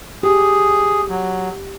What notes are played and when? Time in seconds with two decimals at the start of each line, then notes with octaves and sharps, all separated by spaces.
0.23 G4 G#4
1.09 F#3